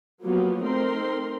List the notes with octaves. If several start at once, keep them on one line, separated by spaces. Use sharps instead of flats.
F3 F#3 A#3 B3 F4 G4
A3 C4 D#4 A#4 C6